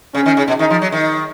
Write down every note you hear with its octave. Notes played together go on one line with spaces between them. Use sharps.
C#3 C#4
D#3
C#3
B2
D#3 D#4
F3
F#3
D#3